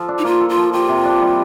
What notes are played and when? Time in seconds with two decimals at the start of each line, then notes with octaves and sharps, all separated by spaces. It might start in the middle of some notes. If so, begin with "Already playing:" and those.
Already playing: F3 A4
0.08 D4
0.18 D#4
0.24 A#3 F4
0.41 A4
0.49 F4
0.57 F3
0.73 F4 G4
0.89 C3
1.05 D4
1.22 G3